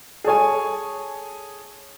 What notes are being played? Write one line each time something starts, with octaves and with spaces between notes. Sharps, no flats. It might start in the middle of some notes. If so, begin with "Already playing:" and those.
G#4 A4 C#5 G#5